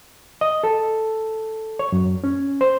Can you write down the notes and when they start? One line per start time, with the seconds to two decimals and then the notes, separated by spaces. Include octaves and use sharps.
0.41 D#5
0.64 A4
1.79 C#5
1.92 F#2
2.24 C#4
2.61 C5